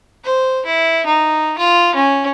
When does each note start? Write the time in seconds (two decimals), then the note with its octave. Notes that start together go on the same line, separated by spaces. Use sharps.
0.25 C5
0.66 E4
1.06 D#4
1.59 F4
1.96 C#4